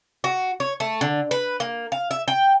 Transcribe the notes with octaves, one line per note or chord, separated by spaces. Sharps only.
F#4
C#5
A3
D3
B4
A#3
F5
E5
G5